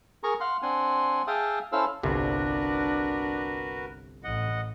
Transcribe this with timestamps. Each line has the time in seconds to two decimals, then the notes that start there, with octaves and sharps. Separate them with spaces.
0.23 G#4 A#4 A#5 C#6
0.40 F5 F#5 C6
0.62 C4 D4 F#5 G#5 C6
1.27 G#4 E5 F5 G5 A5 D#6
1.72 C#4 E4 A4 C5 F5 E6
2.03 G1 C2 C3 D4 F#4 A#4 B4
4.24 A1 D#5 F#5